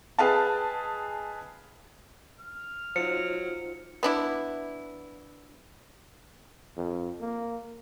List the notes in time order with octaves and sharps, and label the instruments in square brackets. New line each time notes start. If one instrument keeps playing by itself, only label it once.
[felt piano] G#4 B4 D#5 F5 G5 A5
[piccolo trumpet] F6
[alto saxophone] F#3 [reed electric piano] D#4 F4 C5 [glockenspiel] C#7
[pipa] B3 D4 E4
[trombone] F2
A#3